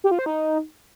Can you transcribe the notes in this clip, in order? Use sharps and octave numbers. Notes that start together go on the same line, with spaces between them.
G4
F4
C5
D#4